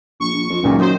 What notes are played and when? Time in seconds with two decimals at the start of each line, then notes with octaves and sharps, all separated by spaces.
0.20 A#1 C#6
0.34 A#1
0.50 F2
0.63 C#2 F#2 A#2 D#3
0.79 F#2 D#3 C5